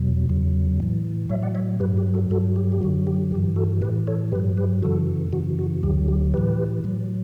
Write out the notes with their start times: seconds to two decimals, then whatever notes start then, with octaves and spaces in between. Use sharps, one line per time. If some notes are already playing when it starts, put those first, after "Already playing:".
Already playing: E2 B2 F#3
0.29 E2 C#3 F#3
0.80 A2 E3
1.29 A2 F#3 C#5 E5
1.43 D5 F#5
1.55 C#5 E5
1.80 G2 F#3 G4 B4
1.97 G4
2.14 F#4 A4
2.30 G2 F#3 F#4 A4
2.56 G4
2.72 G4
2.81 F#2 D3 F#3 F#4
3.07 G4
3.31 G2 G4
3.35 E3
3.56 F#4 A4
3.82 A2 E3 G4 B4
4.07 A4 C#5
4.32 G2 G4 B4
4.35 F#3
4.57 G4 B4
4.82 F#2 C#3 E3 F#4 A4
5.33 F#2 C#3 E3 F#4
5.59 F#4
5.83 D2 D3 F#3 G4
6.08 G4
6.34 A2 E3 G4 B4
6.84 A2 F#3